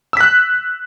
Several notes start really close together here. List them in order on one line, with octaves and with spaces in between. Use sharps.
E6 B6 F#6